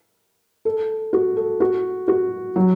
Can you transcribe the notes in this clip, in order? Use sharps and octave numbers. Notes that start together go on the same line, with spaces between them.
A4
F#4
A4
F#4
F#4
F#3